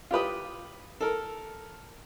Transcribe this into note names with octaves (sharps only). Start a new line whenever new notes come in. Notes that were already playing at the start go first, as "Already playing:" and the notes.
F4 G4 B4 D#6
A4 A#4